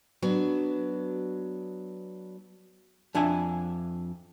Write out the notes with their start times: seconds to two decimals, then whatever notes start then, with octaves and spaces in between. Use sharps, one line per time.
0.22 F#3 B3 D4
3.15 F2 D4 E5 G#5